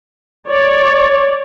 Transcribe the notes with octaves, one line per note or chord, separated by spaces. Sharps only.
C#5 D5